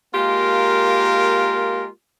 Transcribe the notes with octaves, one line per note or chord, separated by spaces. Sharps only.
G#3 A#3 F4 G4 A#4